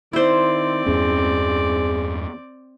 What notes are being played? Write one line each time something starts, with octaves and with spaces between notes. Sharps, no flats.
D#3 C4 E4 C5 D5
E2 G2 C#4 G#4